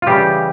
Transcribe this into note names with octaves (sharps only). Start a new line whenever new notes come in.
F4
C#3 E3 G3 G4